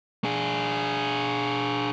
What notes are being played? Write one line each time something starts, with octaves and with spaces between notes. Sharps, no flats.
D4 G#4